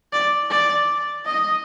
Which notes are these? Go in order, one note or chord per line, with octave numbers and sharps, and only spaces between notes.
D5
D5
D#5